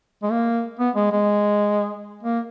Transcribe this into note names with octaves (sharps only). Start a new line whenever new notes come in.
G#3
A#3
B3
G#3
G#3
A#3